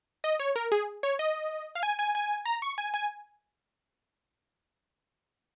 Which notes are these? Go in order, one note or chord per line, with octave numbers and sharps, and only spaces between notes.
D#5
C#5
A#4
G#4
C#5
D#5
F5
G#5
G#5
G#5
A#5
C#6
G#5
G#5